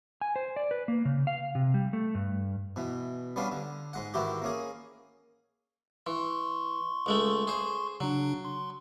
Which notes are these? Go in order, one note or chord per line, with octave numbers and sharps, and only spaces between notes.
G#5
C5
D5
B4
A#3
C#3
F5
C3
G3
A3
G2
B2 E3
G3 B3 C#4 D4 F5
D3
G#2 G#3 F#5
G#2 D#3 E3 E4 F#4 G4
A#3 C#4 G#4
E3 C6 C#6
C#2 G#3 A3
G#4 C5
C#3 F#3 D4
C6